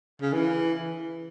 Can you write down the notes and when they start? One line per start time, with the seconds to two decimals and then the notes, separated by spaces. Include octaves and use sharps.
0.21 C#3
0.33 E3